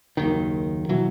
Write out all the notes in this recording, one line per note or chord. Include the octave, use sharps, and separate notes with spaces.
F#1 D#2 D#3
B2 E3 F#3